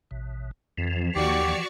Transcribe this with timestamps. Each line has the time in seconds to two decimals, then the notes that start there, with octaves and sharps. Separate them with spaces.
0.11 A1 B2
0.78 F2 E3 F3
1.16 D#2 F#4 G4 D5 C#6